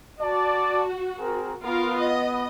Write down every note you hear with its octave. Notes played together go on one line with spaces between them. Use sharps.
F#4 D5 A5
C4 G#4 A#4
B3 F4 A#4
D#5